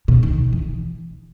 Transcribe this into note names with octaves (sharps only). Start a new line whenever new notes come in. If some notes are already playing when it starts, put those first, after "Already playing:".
B2
D#3
E3